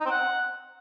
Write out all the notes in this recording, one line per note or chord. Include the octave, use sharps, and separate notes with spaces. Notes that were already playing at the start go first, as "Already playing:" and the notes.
D#4
C4
F#5